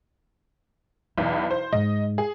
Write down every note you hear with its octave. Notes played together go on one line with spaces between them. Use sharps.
B1 E2 E4
C5
G#2 D#5
G#4